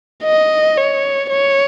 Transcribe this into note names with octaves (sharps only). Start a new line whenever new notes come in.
D#5
C#5
C#5